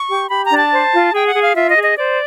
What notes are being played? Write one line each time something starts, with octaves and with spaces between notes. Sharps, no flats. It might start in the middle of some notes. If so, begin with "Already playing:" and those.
Already playing: C#6
G4
G4 B5
A#5
D4
A5
C5
F4
G#4 G5
F#5
G#4
F5
F4 E5
D#5
G#4
D#5
C5 D5